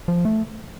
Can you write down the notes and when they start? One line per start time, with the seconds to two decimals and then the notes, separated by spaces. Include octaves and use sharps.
0.08 F3
0.25 A3